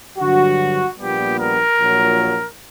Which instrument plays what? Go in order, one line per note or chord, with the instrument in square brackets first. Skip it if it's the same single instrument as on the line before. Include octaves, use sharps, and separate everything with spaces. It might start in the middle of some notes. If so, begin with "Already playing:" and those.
[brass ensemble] G2 D3 F#3 F#4
A#1 A#2 G3 B3 G4
A#4
A#1 A#2 F#3